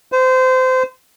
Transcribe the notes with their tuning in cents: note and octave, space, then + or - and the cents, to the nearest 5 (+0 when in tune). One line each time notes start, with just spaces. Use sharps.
C5 -25